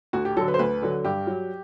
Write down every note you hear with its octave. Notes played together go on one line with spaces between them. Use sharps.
D2 F#4
G4
D3 F#3 A4
B4
C5
D2 B4
D3 F#3
G2 G4
F#3